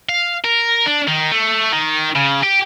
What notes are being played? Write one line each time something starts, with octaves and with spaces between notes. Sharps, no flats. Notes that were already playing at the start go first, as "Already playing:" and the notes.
F5
A#4
D4
D#3
A3
D#3
C#3
G4